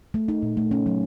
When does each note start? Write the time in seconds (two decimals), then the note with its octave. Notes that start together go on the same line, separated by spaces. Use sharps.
0.14 A3
0.28 D#4
0.43 A#2
0.57 A3
0.71 C#4
0.86 F#3